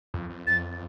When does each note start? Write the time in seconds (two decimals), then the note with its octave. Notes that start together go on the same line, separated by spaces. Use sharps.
0.14 F2
0.30 F2
0.47 F2 A6